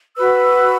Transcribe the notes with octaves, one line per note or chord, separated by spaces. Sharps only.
F#4 B4 E6